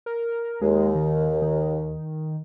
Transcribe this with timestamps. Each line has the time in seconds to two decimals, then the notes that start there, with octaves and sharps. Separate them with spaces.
0.06 A#4
0.61 D#2 G#3
0.95 D#3
1.42 D#3